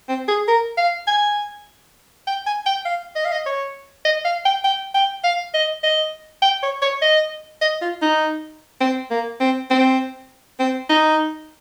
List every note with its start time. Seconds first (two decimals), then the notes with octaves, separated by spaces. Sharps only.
0.09 C4
0.28 G#4
0.48 A#4
0.78 F5
1.07 G#5
2.27 G5
2.47 G#5
2.66 G5
2.86 F5
3.16 D#5
3.25 F5
3.32 D#5
3.46 C#5
4.05 D#5
4.25 F5
4.45 G5
4.64 G5
4.94 G5
5.24 F5
5.54 D#5
5.84 D#5
6.42 G5
6.63 C#5
6.82 C#5
7.02 D#5
7.61 D#5
7.82 F4
8.02 D#4
8.81 C4
9.11 A#3
9.41 C4
9.71 C4
10.59 C4
10.89 D#4